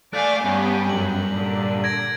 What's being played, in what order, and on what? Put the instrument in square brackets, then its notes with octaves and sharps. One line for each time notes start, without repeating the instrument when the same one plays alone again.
[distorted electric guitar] A3 [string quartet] D5 F5 G#5 [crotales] F#6 G6
[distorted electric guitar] G2 [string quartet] B3 C#4 G4
[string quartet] F#2 [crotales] F#7
[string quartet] A#2 D3
[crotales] G#6 A#6 D7